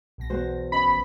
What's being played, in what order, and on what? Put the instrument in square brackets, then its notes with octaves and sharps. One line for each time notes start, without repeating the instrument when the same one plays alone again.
[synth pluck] B1 B2 A#6
[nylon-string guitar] E2 F#4 C5
[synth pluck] C#4 D#5 [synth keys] B5
[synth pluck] G#1 B6